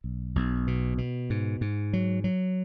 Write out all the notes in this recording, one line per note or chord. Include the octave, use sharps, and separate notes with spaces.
B1
B1
B2
B2
G#2
G#2
F#3
F#3